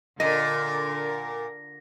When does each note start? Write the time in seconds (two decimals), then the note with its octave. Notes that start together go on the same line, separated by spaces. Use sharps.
0.20 A#2 D3 A#4 D#5 A#6